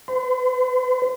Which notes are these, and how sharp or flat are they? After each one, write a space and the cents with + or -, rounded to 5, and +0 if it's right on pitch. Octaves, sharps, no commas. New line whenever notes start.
C5 -45